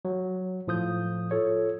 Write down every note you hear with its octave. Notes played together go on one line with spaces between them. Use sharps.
F#3
A2 F3 D#6 G6
F4 A4 C#5